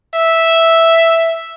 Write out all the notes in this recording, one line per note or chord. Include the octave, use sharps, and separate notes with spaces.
E5